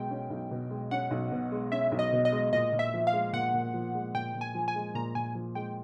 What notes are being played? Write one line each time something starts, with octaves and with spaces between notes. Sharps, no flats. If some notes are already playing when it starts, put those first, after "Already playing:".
Already playing: B1 B2 G#3 G5
C#4
B1
B2
G#3
C#4 F#5
B1
B2
G#3
C#4 E5
B1
D#5
B2
D#5
G#3
A#2 D#5
A#2
E5
F3
F5
G#3
A#2 F#5
A#2
F3
G#3
A#2 G5
A#2
G#5
F3
G#5
G#3
A#2 A#5
A#2 G#5
F3
G#3 G5